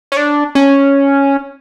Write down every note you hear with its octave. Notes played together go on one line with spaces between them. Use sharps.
C#4
D4
C#4